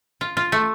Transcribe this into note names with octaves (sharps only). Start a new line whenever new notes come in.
F4
F4
A3